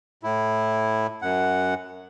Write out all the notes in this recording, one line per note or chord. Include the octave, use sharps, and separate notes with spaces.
A2 E4
F#2 F#5